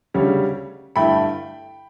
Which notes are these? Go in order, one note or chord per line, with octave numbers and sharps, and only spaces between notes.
D2 C#3 G3 C#4
G2 D3 A3 E4 G5 B5